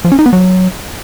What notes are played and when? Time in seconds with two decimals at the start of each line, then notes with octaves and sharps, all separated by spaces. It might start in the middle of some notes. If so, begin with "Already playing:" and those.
0.05 F3
0.12 C#4
0.19 D#4
0.26 B3
0.33 F#3